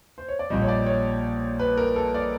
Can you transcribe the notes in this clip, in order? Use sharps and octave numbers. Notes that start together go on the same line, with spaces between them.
C5
C#5
D5
A#1 A#2 G3 D#5
C#5
D5
C#5
B4
A#4
A4
D5